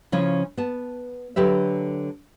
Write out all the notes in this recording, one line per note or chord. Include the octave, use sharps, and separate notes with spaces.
C#3 F3 C#4 E4
B3 A5
D3 F#3 G4 B4 E5